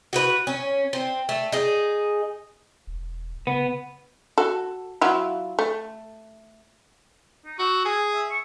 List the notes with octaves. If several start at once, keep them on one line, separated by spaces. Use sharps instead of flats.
F#4 G4 B4
C#4
C4
A3
D#4 G#4
E1
C#3 B3
F#4 A4
F#3 E4 F4
A3
D#4
F#4 E6
G#4 G#5
E5
C#6